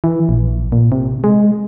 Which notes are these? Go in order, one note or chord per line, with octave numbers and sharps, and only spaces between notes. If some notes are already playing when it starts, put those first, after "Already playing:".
E3
A#1
A#2
C3
G#3